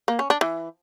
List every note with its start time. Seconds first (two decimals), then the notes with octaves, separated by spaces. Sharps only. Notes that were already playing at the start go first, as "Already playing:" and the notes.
0.08 A#3
0.19 C#4
0.30 D4
0.41 E3